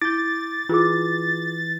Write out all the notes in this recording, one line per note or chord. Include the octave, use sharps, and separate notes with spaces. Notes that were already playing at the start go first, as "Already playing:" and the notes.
E4 D6 G6 A6
E3 F4 G#4 D6